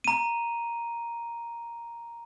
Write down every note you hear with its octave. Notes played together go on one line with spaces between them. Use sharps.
A#5 D#7